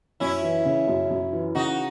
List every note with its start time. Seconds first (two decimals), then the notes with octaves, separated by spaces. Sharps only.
0.20 F#2 C#4 E4
0.43 E3
0.65 C#3
0.88 F#2
1.11 F#2
1.33 E3
1.55 C#3 D#4 F#4